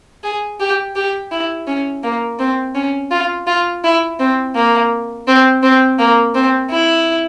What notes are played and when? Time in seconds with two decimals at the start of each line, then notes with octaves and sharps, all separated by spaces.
0.24 G#4
0.60 G4
0.96 G4
1.32 E4
1.67 C#4
2.03 A#3
2.39 C4
2.75 C#4
3.11 F4
3.47 F4
3.84 E4
4.20 C4
4.55 A#3
5.27 C4
5.63 C4
5.99 A#3
6.35 C4
6.70 E4